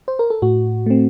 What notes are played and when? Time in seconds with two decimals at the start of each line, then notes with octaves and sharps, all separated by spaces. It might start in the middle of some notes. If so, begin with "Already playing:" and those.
0.08 C5
0.19 A#4
0.30 A4
0.42 A2 F#4
0.86 A3 C4